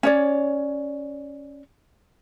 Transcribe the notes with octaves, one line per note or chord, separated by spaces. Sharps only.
C#4 C#5 D5